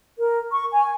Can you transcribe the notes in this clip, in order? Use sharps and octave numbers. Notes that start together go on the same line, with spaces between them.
A#4
C#6
G#5